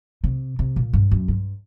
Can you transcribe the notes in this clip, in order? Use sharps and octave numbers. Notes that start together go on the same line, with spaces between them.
C3
C3
A#2
G2
F#2
G2